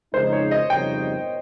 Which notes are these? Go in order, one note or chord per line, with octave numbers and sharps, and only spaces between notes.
F2 C#3 G#3 D#4 C5
C#5
D#5
F2 C#3 G3 C4 D#4 G5